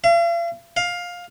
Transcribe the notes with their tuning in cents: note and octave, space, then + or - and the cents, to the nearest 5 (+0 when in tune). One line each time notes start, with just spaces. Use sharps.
F5 -45
F5 +15